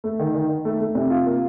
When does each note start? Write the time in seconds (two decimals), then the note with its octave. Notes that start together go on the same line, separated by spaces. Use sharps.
0.04 A3
0.19 D#3
0.34 D#3
0.49 D#3
0.65 A3
0.80 A3
0.95 C3
1.10 F4
1.26 A#3